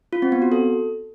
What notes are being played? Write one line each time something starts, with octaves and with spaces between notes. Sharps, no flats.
F4
C4
B3
F#4
A4